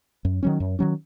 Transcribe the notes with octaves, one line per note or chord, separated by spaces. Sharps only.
F#2
D#3 F#3 C#4
F#2
D#3 F#3 C#4